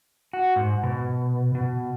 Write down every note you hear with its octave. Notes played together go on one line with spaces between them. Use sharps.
F#4
G#2
B2
B2